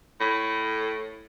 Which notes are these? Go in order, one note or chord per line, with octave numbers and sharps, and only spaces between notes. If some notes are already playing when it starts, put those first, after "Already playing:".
A2